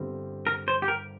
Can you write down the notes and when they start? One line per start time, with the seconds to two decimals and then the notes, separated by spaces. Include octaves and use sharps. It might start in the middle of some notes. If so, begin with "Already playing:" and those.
Already playing: G1 G2 D3 G3 C4
0.47 A#4
0.68 C5
0.82 G4
0.88 A#4